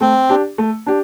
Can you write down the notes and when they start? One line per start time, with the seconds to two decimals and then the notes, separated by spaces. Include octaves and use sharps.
0.01 A3 C4
0.29 D4 G4
0.58 A3
0.86 D4 G4